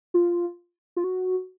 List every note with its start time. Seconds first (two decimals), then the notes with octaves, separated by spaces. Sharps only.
0.14 F4
0.96 F4
1.04 F#4